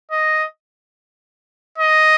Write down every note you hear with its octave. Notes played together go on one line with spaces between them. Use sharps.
D#5
D#5